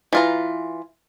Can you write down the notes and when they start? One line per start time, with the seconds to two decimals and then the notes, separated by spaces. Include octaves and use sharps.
0.13 E3 F4 A#5